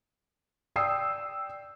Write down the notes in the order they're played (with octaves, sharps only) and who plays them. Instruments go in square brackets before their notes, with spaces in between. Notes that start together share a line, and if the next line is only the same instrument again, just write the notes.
[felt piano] D5 G5 D#6 E6 C7